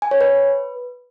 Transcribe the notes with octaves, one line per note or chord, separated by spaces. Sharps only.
G#5
C#5
B4